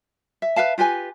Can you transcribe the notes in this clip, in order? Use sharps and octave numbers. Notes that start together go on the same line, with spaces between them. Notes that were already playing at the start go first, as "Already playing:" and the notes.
E5
B4 E5 F5 A5
F4 G4 B4 G#5